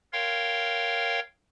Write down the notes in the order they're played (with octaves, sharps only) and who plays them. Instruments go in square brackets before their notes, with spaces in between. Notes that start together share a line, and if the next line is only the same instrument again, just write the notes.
[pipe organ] A#4 C#5 F5 G5 C6